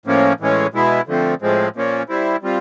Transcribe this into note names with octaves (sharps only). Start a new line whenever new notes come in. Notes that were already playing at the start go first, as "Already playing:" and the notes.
A2 F3 A#3 C#4
A2 E3 G#3 C#4
B2 G#3 B3 E4
D3 F3 A3 C4
A2 F3 G#3 C4
A#2 F3 A#3 C#4
G3 C4 E4
G3 C4 F4